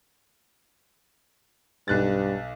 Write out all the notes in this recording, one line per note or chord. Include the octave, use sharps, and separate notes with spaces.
B1 G2 F#6 A6